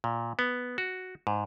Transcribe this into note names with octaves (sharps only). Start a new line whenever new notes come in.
A#2
B3
F#4
G#2